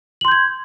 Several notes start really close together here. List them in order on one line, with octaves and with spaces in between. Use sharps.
F#7 C6 G6 G#6